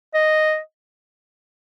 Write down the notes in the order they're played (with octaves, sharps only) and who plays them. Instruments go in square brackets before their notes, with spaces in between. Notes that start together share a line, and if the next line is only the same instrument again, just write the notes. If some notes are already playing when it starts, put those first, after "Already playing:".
[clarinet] D#5